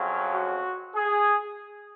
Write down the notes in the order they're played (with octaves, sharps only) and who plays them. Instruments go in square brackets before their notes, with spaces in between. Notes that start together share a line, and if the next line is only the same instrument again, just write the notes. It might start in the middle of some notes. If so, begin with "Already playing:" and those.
Already playing: [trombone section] F2 C#3 F#3
F#4
G#4